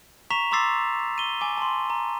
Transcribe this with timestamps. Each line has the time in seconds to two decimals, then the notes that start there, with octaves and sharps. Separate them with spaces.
0.30 A#5 C#6 B6 E7 F7
0.51 A#5 C6 D6 E6 A6 C7
1.18 D#7 G7
1.41 G#5 D6
1.57 A5 C6
1.90 A#5